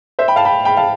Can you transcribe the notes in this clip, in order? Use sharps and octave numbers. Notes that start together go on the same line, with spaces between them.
C5 E5
G5 B5
F5 A5
G5 B5
G5 B5
F5 A5